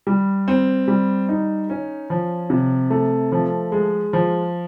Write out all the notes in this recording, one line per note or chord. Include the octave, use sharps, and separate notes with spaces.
G3
C4
G3
D#4
C#4
F3
C3
A3
F3
G#3
F3